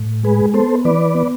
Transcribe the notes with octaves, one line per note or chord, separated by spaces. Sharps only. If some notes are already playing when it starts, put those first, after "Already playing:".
Already playing: A2
G#3 G#4 B4
B3 A4 C5
E3 B4 D5
B3